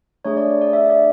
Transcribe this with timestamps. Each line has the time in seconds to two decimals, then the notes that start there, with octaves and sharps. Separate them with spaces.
0.25 A3 D4 G#4 C#5
0.37 D5
0.61 D5
0.73 E5
0.90 D5